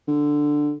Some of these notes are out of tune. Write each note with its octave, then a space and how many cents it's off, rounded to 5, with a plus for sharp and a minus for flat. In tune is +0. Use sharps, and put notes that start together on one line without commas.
D3 +5